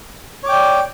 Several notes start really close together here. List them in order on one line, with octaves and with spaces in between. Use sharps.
C#5 D6 G5 D5